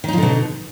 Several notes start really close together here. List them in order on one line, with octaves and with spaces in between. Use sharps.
D#3 D#4 F3 D3 B2